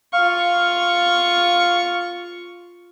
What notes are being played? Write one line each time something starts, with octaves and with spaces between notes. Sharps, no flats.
F4 F5 C#6